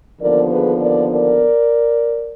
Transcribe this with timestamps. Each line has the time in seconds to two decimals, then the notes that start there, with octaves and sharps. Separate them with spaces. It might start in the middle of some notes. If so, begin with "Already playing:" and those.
0.21 D#2 D3 F3 B3 A#4 D5
0.51 G#4 B4
0.81 A#4 D5
1.11 A#4 D5